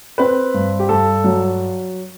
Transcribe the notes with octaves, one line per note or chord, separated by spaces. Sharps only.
C4 B4
G2
G4
G2 A4
F#3